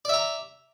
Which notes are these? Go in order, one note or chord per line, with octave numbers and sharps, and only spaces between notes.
D5 E5 A#5